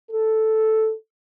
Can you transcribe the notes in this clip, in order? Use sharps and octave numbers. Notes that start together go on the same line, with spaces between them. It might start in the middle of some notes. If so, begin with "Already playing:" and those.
A4